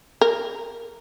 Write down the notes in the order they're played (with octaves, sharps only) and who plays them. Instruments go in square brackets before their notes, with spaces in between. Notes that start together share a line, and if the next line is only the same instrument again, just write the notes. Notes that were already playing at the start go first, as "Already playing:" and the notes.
[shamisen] A#4